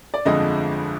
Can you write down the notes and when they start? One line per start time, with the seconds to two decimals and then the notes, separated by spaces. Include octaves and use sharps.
0.14 D5
0.25 G1 F2 D3 F3 G#3 D#5